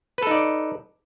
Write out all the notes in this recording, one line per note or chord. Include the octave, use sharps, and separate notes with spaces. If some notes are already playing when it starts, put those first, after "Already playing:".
D#4 A4 B4 D5